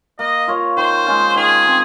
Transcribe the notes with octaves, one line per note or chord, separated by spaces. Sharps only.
A#3 D#5
F4 A#4 C#5
D#3 C5
G#3 C#4 F4
D#3 G#4
G#3 C4